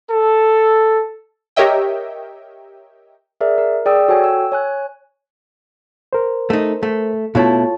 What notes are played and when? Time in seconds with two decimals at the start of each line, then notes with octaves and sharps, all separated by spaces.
0.11 A4
1.56 G4 A#4 C#5 D#5 E5 G5
3.41 G#4 A#4 D5 E5
3.58 A#4
3.86 G#4 D5 G5 D#6 E6
4.08 F#4 A4 C#5 G5 G#5
4.24 E6
4.52 C#5 G#5 F#6
6.13 A#4 C5
6.50 A3 D#4
6.83 A3
7.35 B2 A3 E4 F4 C#5 A5